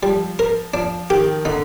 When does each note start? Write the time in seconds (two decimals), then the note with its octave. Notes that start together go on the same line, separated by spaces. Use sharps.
0.02 F3 G3
0.39 A#4
0.74 F3 D4
1.10 D#3 G4
1.45 D3 D#4